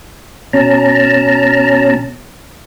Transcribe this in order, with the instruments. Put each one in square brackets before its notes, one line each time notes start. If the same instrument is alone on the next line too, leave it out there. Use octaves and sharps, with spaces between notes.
[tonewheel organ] B2 C#4 A5 A#5